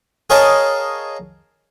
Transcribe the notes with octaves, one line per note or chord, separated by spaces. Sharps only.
G#4 A#4 C#5 D#5 F5 A5